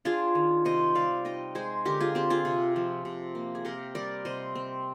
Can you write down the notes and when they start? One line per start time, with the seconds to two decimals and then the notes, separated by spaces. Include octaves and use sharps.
0.05 D4 F4 G#4
0.35 D#3
0.65 C3 C5 D#5
0.95 G3 D5 F5
1.25 D#4 D#5 G5
1.55 G#3 G#4 C5
1.85 D3 G4 A#4
2.00 F4 G#4
2.15 C4 G4
2.30 F4 G#4
2.45 C3
2.76 F3
3.05 C3
3.35 A#3
3.55 G#4
3.65 C3 G4 A#4
3.95 G3 A#4 D5
4.25 C3 C5 D#5
4.55 C4